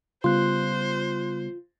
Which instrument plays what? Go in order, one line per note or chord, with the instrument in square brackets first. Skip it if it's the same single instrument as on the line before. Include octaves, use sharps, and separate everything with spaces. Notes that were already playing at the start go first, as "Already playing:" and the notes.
[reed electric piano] C#3 G3 B3 [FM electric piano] F4 [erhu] C5 [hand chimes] C6 F#6